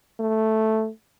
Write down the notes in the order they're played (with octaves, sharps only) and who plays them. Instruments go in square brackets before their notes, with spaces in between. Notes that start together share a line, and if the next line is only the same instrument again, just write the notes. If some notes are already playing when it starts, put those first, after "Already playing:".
[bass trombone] A3